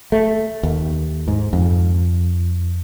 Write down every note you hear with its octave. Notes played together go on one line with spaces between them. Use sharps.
A3
D#2
G#2
F2